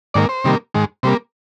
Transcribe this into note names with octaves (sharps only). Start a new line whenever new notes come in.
G#2 D#3 A#3 D5
C5
C3 D#3 G3 A#3
G#2 D#3 G#3
C3 G3 A#3 C5